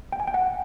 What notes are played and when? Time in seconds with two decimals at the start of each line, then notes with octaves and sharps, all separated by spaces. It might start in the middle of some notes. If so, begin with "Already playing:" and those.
0.12 G5
0.20 G#5
0.27 G5
0.34 F#5